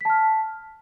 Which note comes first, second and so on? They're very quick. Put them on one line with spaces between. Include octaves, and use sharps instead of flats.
B6 A5 F6